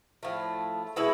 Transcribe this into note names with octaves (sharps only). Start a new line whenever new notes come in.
A2 F3 A3
B2 G#3 B3 E4